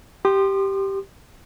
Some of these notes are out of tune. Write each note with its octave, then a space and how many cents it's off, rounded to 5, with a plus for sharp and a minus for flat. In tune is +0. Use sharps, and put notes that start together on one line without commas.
G4 -5 C6 +0 D#6 -45